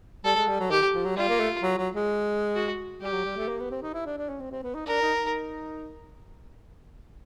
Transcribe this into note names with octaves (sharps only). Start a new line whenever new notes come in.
G3 A4
G#3
G3
F#3
D#3 G4
F3
F#3
G3 F4
A#3
A3
F#3
F#3
G#3
F#4
G3 G4
F#3
G3
A3
A#3
B3
C4
D#4
E4
D4
D4
C#4
C4
C4
B3
D#4
D4 A#4
D#4
D#4